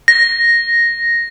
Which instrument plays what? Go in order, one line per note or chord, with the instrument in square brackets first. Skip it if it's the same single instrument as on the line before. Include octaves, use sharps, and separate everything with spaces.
[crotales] A#6